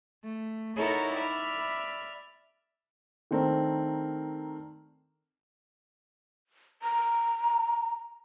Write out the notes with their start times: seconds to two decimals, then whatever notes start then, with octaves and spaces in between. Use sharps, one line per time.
0.25 A3
0.76 D#4 E4 F#4 A4 A#4 C#5
1.15 D5 E5 B5 F6
3.31 D#3 A3 C4 D4 A#4
6.82 A#5